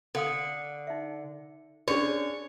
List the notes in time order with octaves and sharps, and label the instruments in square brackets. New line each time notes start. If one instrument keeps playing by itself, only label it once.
[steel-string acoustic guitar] D3 [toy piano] A4 F5 D#6
[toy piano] D#4 E5
[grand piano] C#4 D4 G#4 [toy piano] F#4 D5 [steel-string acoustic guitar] C#5